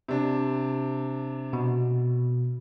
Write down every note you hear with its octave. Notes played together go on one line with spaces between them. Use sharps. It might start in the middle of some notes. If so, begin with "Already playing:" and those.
C3 D4
B2